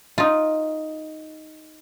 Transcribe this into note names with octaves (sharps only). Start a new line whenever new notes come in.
D#4 F4